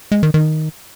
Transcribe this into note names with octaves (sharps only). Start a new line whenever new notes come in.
G#3
D#3
D#3